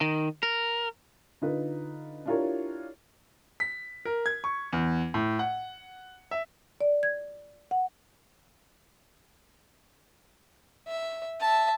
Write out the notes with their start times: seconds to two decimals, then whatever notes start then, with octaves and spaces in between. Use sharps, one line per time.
0.01 D#3
0.43 A#4
1.41 D3 D#4 F4 B4
2.26 D4 E4 F4 G4 A#4 C#5
3.60 B6
4.05 A#4
4.26 G#6
4.44 C#6
4.73 E2
5.14 A2
5.39 F#5
6.31 E5
6.81 D5
7.03 G#6
7.71 F#5
10.88 E5
11.40 E5 A5